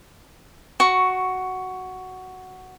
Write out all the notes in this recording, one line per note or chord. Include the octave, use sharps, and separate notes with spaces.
F#4 C#6